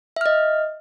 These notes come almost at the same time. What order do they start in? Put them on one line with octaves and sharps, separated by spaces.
E5 F6 D#5